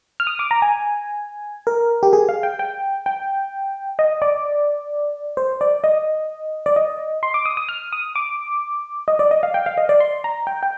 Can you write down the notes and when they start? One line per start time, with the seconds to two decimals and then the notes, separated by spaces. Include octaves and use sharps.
0.20 F6
0.27 D#6
0.39 D6
0.51 A#5
0.62 G#5
1.67 A#4
2.03 G4
2.13 G#4
2.29 F5
2.43 G5
2.59 G5
3.06 G5
3.99 D#5
4.22 D5
5.37 C5
5.61 D5
5.84 D#5
6.66 D5
6.76 D#5
7.23 C6
7.34 D6
7.46 D#6
7.57 D#6
7.69 F6
7.93 D#6
8.16 D6
9.08 D#5
9.19 D5
9.31 D#5
9.43 F5
9.54 G5
9.66 F5
9.77 D#5
9.89 D5
10.00 C6
10.24 A#5
10.47 G5
10.63 G5